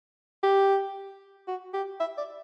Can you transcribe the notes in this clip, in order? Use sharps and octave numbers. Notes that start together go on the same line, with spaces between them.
G4
F#4
G4
E5
D5